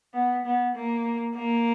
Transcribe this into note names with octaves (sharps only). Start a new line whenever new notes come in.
B3
B3
A#3
A#3